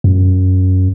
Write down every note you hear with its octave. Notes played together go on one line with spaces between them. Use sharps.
F#2